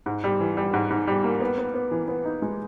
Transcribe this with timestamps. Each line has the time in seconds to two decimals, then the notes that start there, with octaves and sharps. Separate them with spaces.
0.06 G#2
0.24 G3
0.40 E3
0.57 G3
0.74 G#2
0.90 G#2
1.07 G3
1.24 A#3
1.41 B3
1.58 B3
1.74 B3
1.91 E3
2.08 B3
2.25 D#4
2.42 G#3